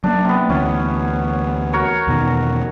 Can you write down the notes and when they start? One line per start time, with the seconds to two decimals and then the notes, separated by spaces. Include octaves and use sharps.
0.04 F#3 G#3 A#3 D4
0.25 C3 B3
0.49 D2 E3 C#4
1.73 F#4 A#4 C#5
2.07 E2 B2 D#3